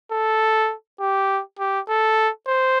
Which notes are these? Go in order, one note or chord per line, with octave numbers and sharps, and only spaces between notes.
A4
G4
G4
A4
C5